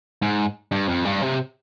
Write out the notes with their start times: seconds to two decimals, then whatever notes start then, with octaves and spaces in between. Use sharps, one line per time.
0.22 G#2
0.72 G2
0.88 F2
1.05 G2
1.22 C3